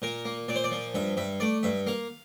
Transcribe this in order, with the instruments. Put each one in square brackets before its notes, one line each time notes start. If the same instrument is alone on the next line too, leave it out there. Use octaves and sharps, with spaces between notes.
[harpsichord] A#2 A#4
A#3
A#2 D5
C5
D5
F3
G2 E5
G2 E5
A3 D5
G2 E5
A#3 F5